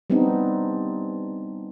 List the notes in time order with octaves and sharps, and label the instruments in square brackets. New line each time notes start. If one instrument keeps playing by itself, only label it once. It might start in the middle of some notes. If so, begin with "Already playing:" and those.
[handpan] G3 B3 C4 D4 D#4